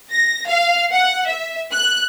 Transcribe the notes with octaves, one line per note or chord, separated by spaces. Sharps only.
A#6
F5
F#5
E5
F#6